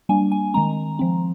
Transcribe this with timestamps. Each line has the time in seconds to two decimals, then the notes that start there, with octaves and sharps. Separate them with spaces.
0.09 G3 A#3 D4 G#5
0.32 G#5
0.54 D#3 G#3 C4 A#5
0.99 F3 C4